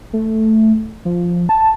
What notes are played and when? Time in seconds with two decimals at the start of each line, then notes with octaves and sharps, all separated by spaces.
0.13 A3
1.05 F3
1.49 A5